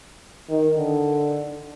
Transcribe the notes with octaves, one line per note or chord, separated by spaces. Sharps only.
D#3
D3